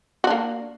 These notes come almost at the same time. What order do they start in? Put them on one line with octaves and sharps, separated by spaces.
F#4 D4 A#3